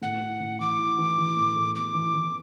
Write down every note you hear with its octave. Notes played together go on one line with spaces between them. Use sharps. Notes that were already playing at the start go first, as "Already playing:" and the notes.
A2 F#5
E4
A2
E3 D6
E4
E3
E3
A2
A2
B3 D6
E3
E3